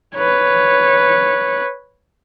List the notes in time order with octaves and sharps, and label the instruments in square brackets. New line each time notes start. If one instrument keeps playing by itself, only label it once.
[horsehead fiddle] B4 C#5